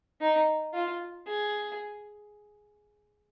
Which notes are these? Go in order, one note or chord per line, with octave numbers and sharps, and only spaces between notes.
D#4
F4
G#4